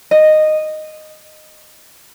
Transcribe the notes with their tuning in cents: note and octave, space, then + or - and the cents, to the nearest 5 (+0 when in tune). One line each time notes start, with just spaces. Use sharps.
D#5 -10